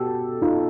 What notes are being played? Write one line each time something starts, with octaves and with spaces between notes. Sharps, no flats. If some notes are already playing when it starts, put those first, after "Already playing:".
Already playing: B2 G4 A4
D#4 F4